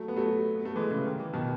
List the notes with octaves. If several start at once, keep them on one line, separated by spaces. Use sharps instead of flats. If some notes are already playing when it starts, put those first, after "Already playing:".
Already playing: F#3 A3
B3
F#3 A3
B3
A3
E3 G#3
C#3 E3
D#3
E3
B2 D#3